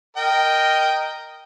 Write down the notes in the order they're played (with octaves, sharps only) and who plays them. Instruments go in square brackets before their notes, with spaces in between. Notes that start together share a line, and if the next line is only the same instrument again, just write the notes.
[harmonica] A#4 D#5 G5